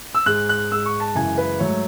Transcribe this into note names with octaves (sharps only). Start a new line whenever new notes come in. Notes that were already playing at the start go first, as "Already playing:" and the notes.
E6
G#2 G#3 F#6
F#6
G#2 G#3 E6
C#6
A5
F#2 C#3 E3 G#3 G#5
B4
G#2 F#3 A3 C#5